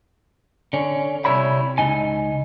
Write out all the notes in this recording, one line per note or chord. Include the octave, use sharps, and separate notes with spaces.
D3 C#4
C2 G2 G3 E4 C#5 B5
C#2 C#3 D#4 G#5